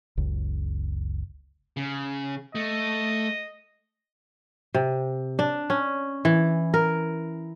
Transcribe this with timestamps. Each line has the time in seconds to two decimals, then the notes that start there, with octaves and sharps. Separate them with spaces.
0.17 F#1 C#2
1.77 C#3
2.55 A3 D#5
4.74 C3
5.39 D4
5.70 C#4
6.25 E3
6.74 A#4